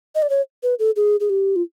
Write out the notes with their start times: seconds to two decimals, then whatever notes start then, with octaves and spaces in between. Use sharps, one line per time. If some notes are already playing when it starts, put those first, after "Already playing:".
0.15 D#5
0.22 D5
0.30 C#5
0.63 B4
0.79 A4
0.96 G#4
1.20 G#4
1.30 G4
1.56 F4